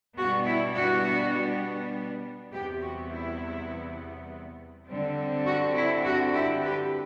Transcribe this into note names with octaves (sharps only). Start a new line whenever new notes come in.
B2 G3 B3 D4 F#4
E4
F#4
E2 C3 G3 B3 E4 G4
F#4
E4
D3 G3 C4
F#4
E4
F#4
E4 G4
G4 B4